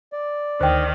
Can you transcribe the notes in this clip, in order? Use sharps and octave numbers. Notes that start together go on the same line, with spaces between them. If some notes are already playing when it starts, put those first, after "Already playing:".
D5
D2 D#3 C5 G5